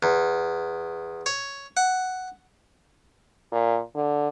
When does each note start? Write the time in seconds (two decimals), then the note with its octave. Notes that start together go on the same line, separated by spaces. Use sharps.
0.03 E2
1.26 C#5
1.77 F#5
3.52 A#2
3.95 D3